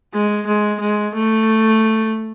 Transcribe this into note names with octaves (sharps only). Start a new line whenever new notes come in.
G#3
G#3
G#3
A3